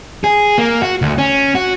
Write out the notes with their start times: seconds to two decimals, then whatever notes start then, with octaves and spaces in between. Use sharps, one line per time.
0.24 G#4
0.58 A#3
0.82 F#4
1.02 D2
1.18 C#4
1.55 F#4